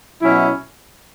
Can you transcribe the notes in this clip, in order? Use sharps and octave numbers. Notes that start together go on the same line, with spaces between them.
B2 F#3 C#4 E4